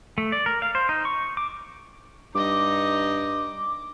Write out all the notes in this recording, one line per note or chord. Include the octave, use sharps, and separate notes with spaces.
A3
D5
A#4
F5
C5
D#4
C#6
D6
G2 D#4 D#5 D6